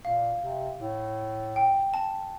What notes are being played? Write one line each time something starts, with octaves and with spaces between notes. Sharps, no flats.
A#2 F5
C3
A2
G5
A5